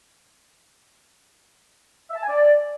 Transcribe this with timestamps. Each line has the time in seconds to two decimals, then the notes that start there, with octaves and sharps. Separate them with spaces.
2.10 E5
2.16 A5
2.22 G#5
2.29 D5